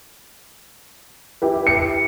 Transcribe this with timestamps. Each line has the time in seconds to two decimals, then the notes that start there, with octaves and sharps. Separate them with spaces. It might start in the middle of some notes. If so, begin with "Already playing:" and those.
1.42 E4 G4 B4
1.67 C#7